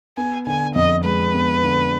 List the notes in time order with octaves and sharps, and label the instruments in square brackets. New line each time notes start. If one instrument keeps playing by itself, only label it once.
[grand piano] B3 [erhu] G#5
[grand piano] D3 [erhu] G#5
[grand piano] F2 [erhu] D#5
[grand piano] G#3 [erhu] B4
[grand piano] B3
D3